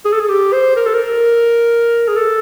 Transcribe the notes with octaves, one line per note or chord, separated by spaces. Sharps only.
G#4
A4
G#4
G4
C5
A#4
A4
A#4
G#4
A4